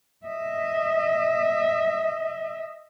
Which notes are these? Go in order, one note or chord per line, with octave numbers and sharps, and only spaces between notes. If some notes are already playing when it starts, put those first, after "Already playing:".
D#5 E5